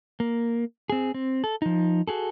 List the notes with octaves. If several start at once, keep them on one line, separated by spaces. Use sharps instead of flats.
A#3
C4 G#4
C4
A4
F3 D#4
F#4 G#4 A4